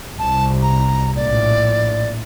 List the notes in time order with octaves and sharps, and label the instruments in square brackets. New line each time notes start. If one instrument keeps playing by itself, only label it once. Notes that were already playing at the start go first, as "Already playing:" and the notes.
[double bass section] C2 [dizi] A5
[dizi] A#5
[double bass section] A#1 A2 [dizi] D5